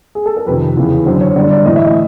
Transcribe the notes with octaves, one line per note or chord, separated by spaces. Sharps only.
G#4
A4
A#4
F2 C3 D#3 B4
E2 C#3 E3
F#2 D3 C5
C#5
G2 D3 D5
D5
A2 E3 D#5
E5
D#5